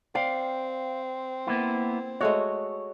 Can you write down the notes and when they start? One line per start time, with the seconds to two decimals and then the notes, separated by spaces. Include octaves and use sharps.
0.15 C4 D5 F5 G5
1.47 A#3 B3 E4
2.21 G#3 A3 F#4 C#5